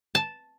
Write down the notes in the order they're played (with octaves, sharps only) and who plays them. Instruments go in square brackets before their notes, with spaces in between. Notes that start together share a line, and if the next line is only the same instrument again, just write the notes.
[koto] A5